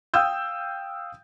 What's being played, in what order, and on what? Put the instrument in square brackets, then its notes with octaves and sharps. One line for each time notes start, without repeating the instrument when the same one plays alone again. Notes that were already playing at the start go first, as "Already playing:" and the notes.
[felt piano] F5 G5 D#6 E6 G6